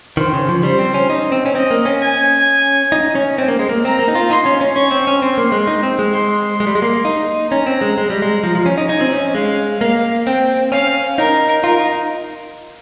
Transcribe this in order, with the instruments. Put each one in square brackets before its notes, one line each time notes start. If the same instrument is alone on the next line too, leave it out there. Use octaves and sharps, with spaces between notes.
[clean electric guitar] D#3 [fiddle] C5
[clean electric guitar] C#3
F3
[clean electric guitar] G3 [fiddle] C5
[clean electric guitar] C4
C#4
D#4
C4
C#4
[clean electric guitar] C4 [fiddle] D#5
[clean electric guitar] A#3
C#4
[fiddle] G#5
[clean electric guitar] D#4
C#4
C4
A#3
G#3
A#3
[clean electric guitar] C4 [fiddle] A#5
[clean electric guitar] A#3
D#4
F4
[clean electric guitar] D#4 [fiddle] C6
[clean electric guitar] C#4
C#4
[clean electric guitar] C#4 [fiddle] C#6
[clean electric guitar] C4
C#4
[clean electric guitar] C4 [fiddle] C6
[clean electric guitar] A#3
G#3
D#4
C4
G#3
[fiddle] C6
[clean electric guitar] G#3
G3
G#3
A#3
D#4
[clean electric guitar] C#4 [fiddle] A#5
[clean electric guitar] C4
G#3
G#3
G3
G#3
F3
F3
C#4
D#4
[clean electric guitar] D#4 [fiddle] G#5
[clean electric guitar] C4
C#4
[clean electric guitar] G#3 [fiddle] F5
[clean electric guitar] A#3 [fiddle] F5
[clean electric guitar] C4 [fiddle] G5
[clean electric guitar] C#4 [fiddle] F5
[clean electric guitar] D#4 [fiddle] A#4
[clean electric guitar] F4 [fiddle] A#4
[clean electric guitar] D#4